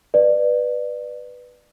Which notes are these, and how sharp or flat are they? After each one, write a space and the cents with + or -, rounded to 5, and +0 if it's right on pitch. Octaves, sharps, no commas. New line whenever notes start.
B4 +0 D5 +25